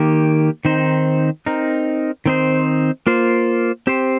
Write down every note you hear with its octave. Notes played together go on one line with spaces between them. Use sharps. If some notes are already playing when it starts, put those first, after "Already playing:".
Already playing: D#3 A#3 G4
D#3 C4 D#4 C5
C4 D#4 A#4
D#3 C4 D#4 C5
A#3 F4 C5
C4 G4 C5